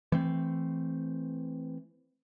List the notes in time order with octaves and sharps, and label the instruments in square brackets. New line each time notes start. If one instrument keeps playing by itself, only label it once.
[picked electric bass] E3 A3 C4